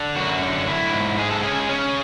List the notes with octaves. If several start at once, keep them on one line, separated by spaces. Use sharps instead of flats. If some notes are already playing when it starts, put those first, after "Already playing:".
Already playing: D3
F#2 F#4
D3
E4
G#2
G#3 G#4
A4
C#4 G#4
C#4